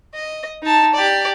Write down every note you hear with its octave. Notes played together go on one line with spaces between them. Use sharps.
D#5
D#4 A5
G4 D5